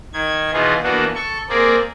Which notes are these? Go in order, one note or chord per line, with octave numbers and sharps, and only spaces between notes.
D#3 G#6
B2 E3 B3 D#4 F4 G#4
E3 A#3 B3 D4 F#4
A4 C#6
A#3 C4 G#4 A#4 D5